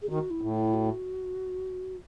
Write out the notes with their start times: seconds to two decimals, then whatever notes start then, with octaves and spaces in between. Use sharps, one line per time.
0.02 G#4
0.09 D#3 F#4
0.30 E4
0.41 A2
0.52 E4
0.74 F#4